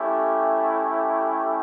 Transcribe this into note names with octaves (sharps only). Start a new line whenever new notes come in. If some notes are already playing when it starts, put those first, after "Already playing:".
Already playing: A3 C#4 E4 G4